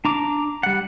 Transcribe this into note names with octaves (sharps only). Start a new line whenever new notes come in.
D4 A#5 D6
G3 F#5